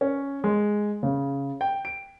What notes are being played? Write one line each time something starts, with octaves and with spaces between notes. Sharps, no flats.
C#4
G#3
C#3
G5
D7